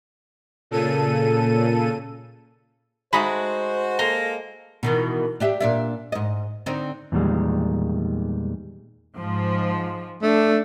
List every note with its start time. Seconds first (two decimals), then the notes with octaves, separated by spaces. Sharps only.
0.71 A#2 C#3 A4 D#7
3.13 G#3 A3 D#4 F#4 C5 B5
3.99 A#3 A4 A#5 C6
4.83 B2 D#3 E3
5.40 D4 G4 E5
5.60 A#2 D4 E5
6.12 G#2 D#5
6.66 D3 C4 D#4
7.12 E2 A#2 D#3 G3 G#3
9.17 G#2 F3
10.22 A3 D4